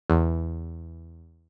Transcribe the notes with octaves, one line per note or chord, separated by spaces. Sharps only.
E2